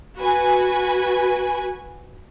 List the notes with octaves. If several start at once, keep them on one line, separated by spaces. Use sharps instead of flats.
F#4 B4 G#5